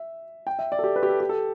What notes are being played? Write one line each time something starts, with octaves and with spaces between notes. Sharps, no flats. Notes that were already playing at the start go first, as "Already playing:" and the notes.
Already playing: E5
G5
E5
D5
A4
G4
B4
G4
A4
G4
A4